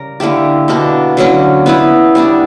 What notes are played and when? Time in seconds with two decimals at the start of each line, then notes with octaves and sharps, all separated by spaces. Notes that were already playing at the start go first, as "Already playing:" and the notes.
Already playing: C#3 G3 A#4
0.20 D3 A#3 E4 G4
0.68 B2 A#3 D4
1.17 D3 F#3 A#3 C#4
1.66 B3 E4 B4
2.15 G3 B3 D4